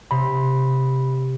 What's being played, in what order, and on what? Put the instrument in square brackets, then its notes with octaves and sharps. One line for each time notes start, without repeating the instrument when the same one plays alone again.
[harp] C3 [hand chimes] B5